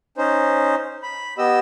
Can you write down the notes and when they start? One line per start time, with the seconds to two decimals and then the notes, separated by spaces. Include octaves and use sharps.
0.18 C#4 D#4 C5
1.03 B5
1.38 B3 G4 D#5 E6